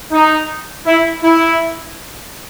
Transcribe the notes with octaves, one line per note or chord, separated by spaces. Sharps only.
D#4
E4
E4